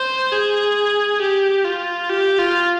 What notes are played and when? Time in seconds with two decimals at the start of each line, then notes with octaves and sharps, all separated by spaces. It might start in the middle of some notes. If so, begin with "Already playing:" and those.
Already playing: C5
0.32 G#4
1.21 G4
1.65 F4
2.10 G4
2.39 F4